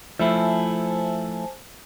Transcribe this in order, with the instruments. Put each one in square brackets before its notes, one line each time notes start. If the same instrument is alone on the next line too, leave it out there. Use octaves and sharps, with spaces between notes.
[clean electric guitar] F3 A3 E4 [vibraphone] C5 G#5 A5 [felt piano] E5